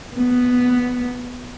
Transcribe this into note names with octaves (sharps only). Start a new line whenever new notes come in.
B3